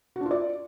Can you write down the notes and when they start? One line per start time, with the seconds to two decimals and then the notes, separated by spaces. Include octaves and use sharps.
0.16 F#4
0.21 D4
0.26 F4
0.31 D5